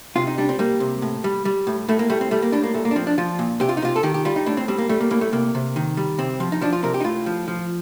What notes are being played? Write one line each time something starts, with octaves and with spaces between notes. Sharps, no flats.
C3 F4
D#4
G3 D4
C4
G3 A#3
C3
A2
G3
G3
A2
A2 A3
A#3
G3 A3
C4
G3 A3
A#3
A2 D4
A#3
A#2 A3
A#3
D4
F3 C4
D4
F3 F4
A#2
C3 G4
F4
D#4
C3 F4
A4
D#3 G4
G4
G3 F4
D#4
A2 D4
C4
G3 C4
A#3
G3 A3
A#3
A2 A#3
A3
C3 A#3
C3
D#3
G3
C3 C4
F3
D#4
F3 D4
F4
C3 A#4
G4
D#4
A2 F4
F3
F3